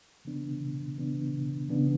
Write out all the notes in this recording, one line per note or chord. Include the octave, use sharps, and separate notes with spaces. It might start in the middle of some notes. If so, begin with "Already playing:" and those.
C#3 E3 B3 D4
C#3 E3 B3 D4
C#3 E3 B3 D4